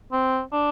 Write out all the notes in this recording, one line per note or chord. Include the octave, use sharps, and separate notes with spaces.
C4
D4